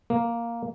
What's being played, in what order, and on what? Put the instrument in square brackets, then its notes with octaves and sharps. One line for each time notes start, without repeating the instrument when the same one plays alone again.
[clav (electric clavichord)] A#3